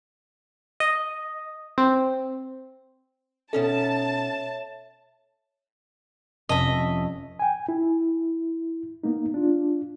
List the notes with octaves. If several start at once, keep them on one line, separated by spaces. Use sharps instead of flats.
D#5
C4
B2 C#4 D#4 A4 C#5 E5 A5
F1 C#4 D#5 E5 A5
G5 G#5
E4
A#3 B3 D#4
D4 F4